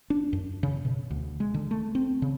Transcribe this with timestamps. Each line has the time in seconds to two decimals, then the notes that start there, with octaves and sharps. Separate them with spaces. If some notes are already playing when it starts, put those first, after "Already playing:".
0.10 D4
0.33 F#2
0.63 C#3
0.85 B2
1.10 D2
1.40 G#3
1.54 D3
1.71 A3
1.95 C4
2.22 C#3